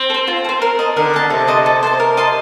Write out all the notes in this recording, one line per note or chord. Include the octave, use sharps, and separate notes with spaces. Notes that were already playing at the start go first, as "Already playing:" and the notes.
Already playing: C4
A4
C5
F4
A4
C5
A#4
D#5 A5
D3 A#4
D#5 A5
C3 A4
C5 D#5 A5
A4
C5 D#5 A5
A#4
D#5 A5 C6